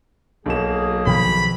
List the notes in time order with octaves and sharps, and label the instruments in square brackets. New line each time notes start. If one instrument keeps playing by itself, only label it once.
[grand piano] B1 E7 [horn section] F#3 A#3 G#4
[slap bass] B2 D#3 F3 [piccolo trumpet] B5